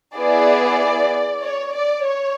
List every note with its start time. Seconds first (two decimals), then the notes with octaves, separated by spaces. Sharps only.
0.16 B3 E4 G#4 D5
1.43 C#5
1.74 D5
2.06 C#5